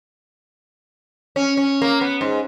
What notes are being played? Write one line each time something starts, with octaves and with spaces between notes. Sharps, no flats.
C#4
C#4
A#3
B3
G#2